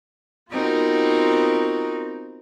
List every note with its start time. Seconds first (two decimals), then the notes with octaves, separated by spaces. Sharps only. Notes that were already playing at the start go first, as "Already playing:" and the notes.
0.51 B3 C4 D#4 F4 F#4 A#4